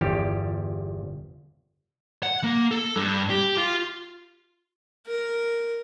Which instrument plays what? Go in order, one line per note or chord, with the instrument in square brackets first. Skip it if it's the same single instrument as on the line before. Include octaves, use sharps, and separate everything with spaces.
[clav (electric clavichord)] G1 E2 F3 G3 G4
[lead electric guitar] F#5
A#3
A4
G2
G4
F4
[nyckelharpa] A#4